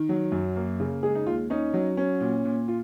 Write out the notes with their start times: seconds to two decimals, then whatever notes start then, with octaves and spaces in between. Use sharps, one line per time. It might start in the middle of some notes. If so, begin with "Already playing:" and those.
Already playing: D#3
0.09 F#3
0.32 F#2
0.56 A#3
0.80 C#3
1.03 G#3 G#4
1.15 D#4
1.26 D#2 F4
1.50 C#4 D#4
1.74 F#3
1.97 C#4
2.21 A#2
2.45 A#2
2.68 F4